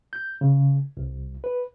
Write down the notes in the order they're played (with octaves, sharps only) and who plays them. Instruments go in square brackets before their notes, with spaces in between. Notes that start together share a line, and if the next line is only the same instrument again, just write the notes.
[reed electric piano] G6
C#3
C2
B4